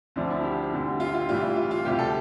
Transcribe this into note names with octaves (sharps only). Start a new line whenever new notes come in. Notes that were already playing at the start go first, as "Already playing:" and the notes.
D2 D3 F3 D4
E4
G4
D2 D3 G3
F4
F4
A2 E3 G3 F4
F4
F4
D2 C3 G3 G4
A4